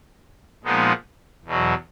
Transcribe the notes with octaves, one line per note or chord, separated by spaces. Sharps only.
A#2 F3 G#3 B3 D#4
E2 B2 F#3